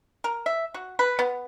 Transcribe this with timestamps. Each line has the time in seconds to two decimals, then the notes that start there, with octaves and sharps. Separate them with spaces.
0.24 A#4
0.46 E5
0.74 F#4
0.99 B4
1.19 B3